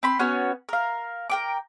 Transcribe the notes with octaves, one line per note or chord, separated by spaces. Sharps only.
C4 B5 C6
B3 C#4 F#4 C#5
A#4 F5
A#4 G5 D6